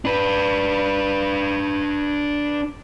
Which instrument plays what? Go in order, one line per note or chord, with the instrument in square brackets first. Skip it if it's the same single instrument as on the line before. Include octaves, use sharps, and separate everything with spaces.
[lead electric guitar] D4 B4